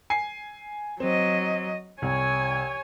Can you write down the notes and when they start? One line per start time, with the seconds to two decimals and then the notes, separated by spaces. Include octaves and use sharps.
0.10 G#5 C7
1.00 F#3 C4 D#5
2.02 C2 C#5 G#5